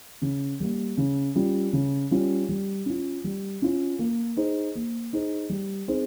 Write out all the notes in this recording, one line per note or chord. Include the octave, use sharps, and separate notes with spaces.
C#3
G3 A#3
C#3
G3 C#4 F4
C#3
G3 C#4 F4
G3
C#4 F4
G3
C#4 F4
A#3
D#4 G#4 C5
A#3
D#4 G#4 C5
G3
C4 D#4 G#4 C5